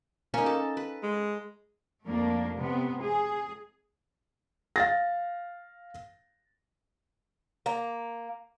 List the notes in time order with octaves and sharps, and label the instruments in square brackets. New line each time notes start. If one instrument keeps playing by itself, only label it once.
[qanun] A#3 D#4 [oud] C#4
[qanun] A4 A5
B4
[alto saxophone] G#3
[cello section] F2 A3 A#3 D4
C3 B3
G#4
[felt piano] F5 A6 A#6
[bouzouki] A#3